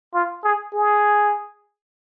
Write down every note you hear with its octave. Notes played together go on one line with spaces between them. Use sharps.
F4
G#4
G#4